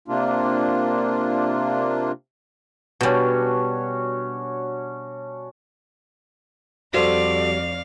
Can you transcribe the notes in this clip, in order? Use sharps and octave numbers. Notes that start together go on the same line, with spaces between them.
C3 A#3 D4 F4
B2 G3 C#4 D4 F#4
F2 G3 F#4 A4 C5 D5 F5 C6